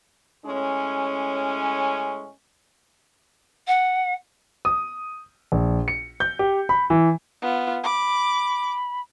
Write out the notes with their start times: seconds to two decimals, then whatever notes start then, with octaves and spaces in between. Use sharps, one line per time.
0.45 A2 G#3 C#4
3.67 F#5
4.65 D#6
5.52 A#1
5.88 C#7
6.20 G6
6.39 G4
6.69 B5
6.90 E3
7.42 B3 F4
7.84 B5 D6